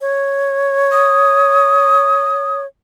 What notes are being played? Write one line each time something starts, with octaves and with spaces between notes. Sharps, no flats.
C#5
D#6